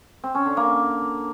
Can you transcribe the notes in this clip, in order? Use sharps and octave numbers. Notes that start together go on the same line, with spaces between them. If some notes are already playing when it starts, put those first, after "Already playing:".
C4
C#4
D3
A#3